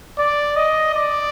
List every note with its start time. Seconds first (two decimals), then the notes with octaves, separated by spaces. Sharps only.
0.18 D5
0.56 D#5
0.95 D5